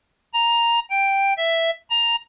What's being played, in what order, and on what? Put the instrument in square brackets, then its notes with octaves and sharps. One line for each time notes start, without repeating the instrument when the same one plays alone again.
[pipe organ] A#5
G5
E5
A#5